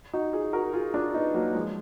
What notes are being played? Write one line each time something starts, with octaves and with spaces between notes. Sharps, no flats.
D#4 F#4
F4 G#4
F#4 A#4
F4 G#4
D4 F4
B3 D#4
F#3 A#3
F3 G#3